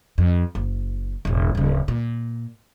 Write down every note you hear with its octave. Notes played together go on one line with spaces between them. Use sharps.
F2
F#1
E1 A1
D1 C#3
A#2